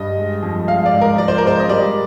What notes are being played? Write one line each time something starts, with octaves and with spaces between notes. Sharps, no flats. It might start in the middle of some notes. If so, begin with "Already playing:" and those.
Already playing: G2 G3 D#5
G#3
F2
G#3 F5
D5
G#2
A#4
F3 D5
C5
A#4
G#3 C5
D#5
G3 D5